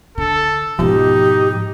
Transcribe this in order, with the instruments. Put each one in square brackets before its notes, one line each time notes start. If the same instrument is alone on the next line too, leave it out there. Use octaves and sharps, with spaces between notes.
[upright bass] D3 [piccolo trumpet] A4
[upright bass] G#2 B2 [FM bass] F3 [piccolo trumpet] D#4 [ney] G4